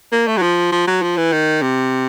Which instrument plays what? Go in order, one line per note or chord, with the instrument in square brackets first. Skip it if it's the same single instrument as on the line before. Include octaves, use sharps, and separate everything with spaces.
[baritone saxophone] A#3
A3
F#3
F3
F3
F#3
F3
E3
D#3
C3